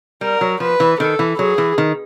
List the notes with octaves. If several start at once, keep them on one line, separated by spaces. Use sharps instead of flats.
G3 A#4
F#3
F3 B4
E3
D#3 A4
E3
F#3 G#4
E3
D#3